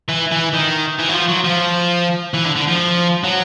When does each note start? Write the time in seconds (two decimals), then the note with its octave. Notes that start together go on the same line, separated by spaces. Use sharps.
0.09 E3
0.32 E3
0.54 D#3
0.99 E3
1.09 F#3
1.14 F3
1.28 F#3
1.44 F3
2.34 E3
2.45 D3
2.56 D3
2.68 F3
3.24 F#3